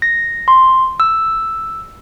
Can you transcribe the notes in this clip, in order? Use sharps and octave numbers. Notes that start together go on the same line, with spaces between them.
A#6
C6
E6